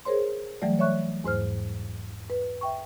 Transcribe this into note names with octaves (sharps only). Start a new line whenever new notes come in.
G#4 A#4 C5 C#5 C6
E3 F#3 G3 A3 D5
C#5 D5 E5 C#6 F#6
E2 G#2 C5 F6
B4
E5 G5 C#6